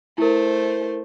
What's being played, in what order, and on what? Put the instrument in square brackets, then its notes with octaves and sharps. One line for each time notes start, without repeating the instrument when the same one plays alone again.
[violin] A3 C5 [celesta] E4 A#4